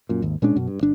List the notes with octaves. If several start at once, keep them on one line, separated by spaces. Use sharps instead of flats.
F#2 A#2
G#1 D#2
A#2 G#3 C#4 D4
F#2 B2
G2
G1 D4